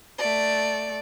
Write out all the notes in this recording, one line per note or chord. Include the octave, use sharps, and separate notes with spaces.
A3 D5